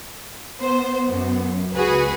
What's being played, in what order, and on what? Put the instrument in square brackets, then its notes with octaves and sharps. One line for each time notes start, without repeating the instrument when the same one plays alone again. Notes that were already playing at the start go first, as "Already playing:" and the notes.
[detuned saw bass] B3 [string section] C5
[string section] F#2
[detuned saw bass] C#2 [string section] F#4 G#4 B4